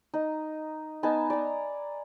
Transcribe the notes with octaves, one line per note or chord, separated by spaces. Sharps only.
D#4
B3 D#4 G#5 A5
D5 A#5